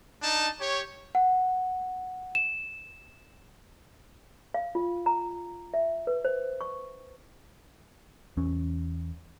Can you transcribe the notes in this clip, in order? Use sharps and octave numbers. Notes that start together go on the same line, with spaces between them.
D4 D#4 A5
G4 C#5
F#5
E7
F5
F4
A#5
E5
B4
C5
C#6
E2 C#4